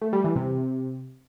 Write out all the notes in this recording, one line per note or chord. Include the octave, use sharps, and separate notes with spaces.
A3
G3
E3
C3